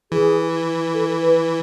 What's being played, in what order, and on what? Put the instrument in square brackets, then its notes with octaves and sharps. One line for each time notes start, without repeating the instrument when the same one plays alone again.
[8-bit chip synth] E3 [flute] G#4
[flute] A4
B4